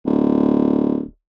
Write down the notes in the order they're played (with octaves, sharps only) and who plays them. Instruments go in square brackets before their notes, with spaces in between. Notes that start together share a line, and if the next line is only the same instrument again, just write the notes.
[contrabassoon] D1